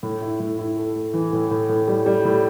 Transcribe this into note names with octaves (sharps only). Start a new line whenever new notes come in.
A2
E4
A2
E4
A3
A3
E3
A2
A2
A2
G3
G3
A2